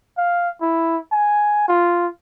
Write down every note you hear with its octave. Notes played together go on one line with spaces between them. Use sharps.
F5
E4
G#5
F4